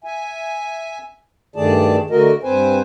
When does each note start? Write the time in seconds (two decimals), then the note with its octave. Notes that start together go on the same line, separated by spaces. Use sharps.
0.04 E5 G#5
1.56 G2 D#3 A3 G#4 D5 A5
2.10 D3 A3 F#4 A#4 D#5
2.43 G2 C4 B4 C5 G#5